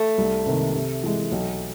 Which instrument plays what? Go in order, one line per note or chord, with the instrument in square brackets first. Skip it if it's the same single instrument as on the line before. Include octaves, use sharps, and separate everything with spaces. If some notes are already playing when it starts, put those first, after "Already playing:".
Already playing: [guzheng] A3
[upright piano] C2
C3 D#3
C3
E3 G#3
B1